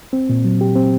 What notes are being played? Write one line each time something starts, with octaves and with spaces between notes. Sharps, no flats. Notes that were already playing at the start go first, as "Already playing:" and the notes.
C4
A#2
F#3
G4
C4